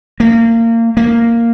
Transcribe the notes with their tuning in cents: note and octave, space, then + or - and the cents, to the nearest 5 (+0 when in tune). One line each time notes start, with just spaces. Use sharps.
A#3 -25
A#3 -5